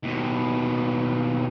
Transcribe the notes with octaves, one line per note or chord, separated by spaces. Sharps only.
D#2 B2